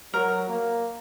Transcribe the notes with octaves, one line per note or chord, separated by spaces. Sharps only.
F#3 A#4
A#3